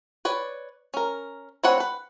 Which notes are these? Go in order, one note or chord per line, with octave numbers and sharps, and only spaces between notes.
B4 C#5 D5
C#4 A#4
C4 D4 B4 C#5 F#5
B4 F#5